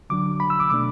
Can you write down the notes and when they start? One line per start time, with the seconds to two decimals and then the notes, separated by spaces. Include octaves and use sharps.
0.10 D3 F#3 D4 D6
0.40 B5
0.50 E6
0.60 D6
0.70 B2 A3 D4 D6